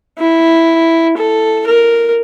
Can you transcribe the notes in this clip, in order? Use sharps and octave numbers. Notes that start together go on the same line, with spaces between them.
E4
A4
A#4